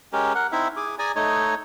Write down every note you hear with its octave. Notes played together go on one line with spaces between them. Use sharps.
G#3 C#4 G4 A#4
A#4 F#5
C4 D#4 E4 E5
G#4 D6
G#4 D5 G#5 A#5
A3 D#4 C#5 D#5